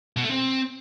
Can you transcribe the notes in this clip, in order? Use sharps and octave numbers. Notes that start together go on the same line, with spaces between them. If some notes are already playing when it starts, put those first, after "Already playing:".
B2
A3
C4